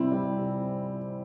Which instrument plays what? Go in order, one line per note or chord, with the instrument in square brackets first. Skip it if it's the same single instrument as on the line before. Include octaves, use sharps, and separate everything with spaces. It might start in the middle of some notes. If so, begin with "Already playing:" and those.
Already playing: [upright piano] C3 E3 G3 [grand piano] C4 E4
[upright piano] G3
C3